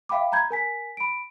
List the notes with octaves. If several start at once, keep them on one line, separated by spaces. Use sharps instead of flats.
E5 F5 G5 B5 D6
A#5 B5 G6 G#6
A#4 G#5 B6
B5 D7